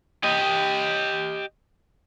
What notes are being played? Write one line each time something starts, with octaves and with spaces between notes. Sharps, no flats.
G4 D#5